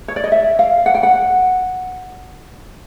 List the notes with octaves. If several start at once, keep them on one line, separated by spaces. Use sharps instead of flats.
C#5
D5
D#5
E5
F5
F#5
G5
F#5